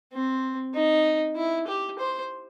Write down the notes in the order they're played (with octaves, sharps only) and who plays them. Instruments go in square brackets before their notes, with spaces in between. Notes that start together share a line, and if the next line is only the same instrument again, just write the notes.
[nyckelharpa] C4
D#4
E4
G4
C5